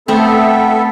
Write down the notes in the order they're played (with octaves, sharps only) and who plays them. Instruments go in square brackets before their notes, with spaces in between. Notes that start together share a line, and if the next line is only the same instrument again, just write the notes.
[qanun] A3 C4 [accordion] B3 A4 E5 [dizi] G5